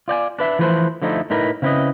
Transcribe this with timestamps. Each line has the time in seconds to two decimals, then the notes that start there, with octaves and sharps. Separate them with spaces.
0.08 F4 D5 G5 G#5
0.39 D4 B4 E5
0.59 E3 F3 A3 B4 C5
1.02 D3 F3 A3 D#4 E4
1.30 A2 D#4 E4 A#4 B4
1.62 C#3 C4 E4 A4 B4 D#5